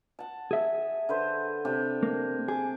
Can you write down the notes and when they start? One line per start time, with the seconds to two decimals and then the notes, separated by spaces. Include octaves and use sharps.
0.19 F#5 A5
0.51 G#4 E5
1.09 D3 B4 C5
1.65 C3 D4 G4
2.03 A#3
2.48 G#4 D6